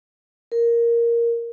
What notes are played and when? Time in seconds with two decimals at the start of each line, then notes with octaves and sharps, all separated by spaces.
0.52 A#4